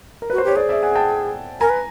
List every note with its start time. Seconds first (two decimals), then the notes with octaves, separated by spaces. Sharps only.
0.22 A#4
0.30 F#4 B4
0.38 C5
0.44 G4 C#5
0.56 G#4 C5 D5
0.69 D5 E5
0.83 F#5 G#5
0.95 G5 A5
1.61 A#4 G#5 A#5
1.70 B4